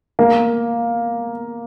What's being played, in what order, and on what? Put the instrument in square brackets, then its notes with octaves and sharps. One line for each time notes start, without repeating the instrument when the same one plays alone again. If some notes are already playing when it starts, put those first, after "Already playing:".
[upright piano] A#3